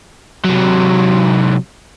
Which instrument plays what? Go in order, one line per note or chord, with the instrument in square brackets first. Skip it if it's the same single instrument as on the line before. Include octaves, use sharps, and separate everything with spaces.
[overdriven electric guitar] C3 F#3